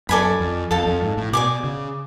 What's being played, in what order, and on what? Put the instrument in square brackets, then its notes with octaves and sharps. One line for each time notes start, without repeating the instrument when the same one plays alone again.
[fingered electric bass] F#2 [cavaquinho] A4 D5 G#5 B5
[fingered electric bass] F2
[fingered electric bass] F2 [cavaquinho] A4 F5 A5
[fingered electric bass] F2
G#2
A2
[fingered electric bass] B2 [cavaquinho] D5 G#5 D6
[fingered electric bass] C#3